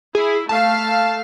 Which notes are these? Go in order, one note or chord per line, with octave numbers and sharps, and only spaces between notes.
E4 G#4
A3 F5 A5